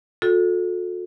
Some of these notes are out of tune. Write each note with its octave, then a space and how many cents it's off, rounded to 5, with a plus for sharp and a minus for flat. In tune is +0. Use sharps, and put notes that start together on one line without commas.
F#4 -45 A4 +0